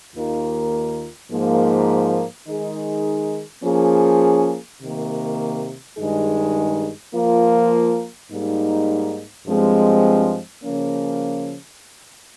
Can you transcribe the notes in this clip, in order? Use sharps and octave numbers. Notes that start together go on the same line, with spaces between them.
D#2 D#3 A#3 F4 A#4
G#2 F3 A#3
D#3 G#3 D#4 G#4
F3 A#3 C#4 G#4
C3 D#3 A#3
G2 D#3 G#3 D#4 G#4
F3 A#3 F4 A#4
G#2 G3 A#3 D#4
G2 F3 G#3 C4
C#3 F3 A#3 C#4